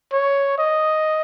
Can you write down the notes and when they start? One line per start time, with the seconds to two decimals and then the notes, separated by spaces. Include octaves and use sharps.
0.13 C#5
0.58 D#5